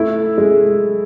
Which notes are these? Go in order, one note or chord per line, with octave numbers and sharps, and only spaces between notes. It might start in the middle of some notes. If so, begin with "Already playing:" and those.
Already playing: A3 E4
G#3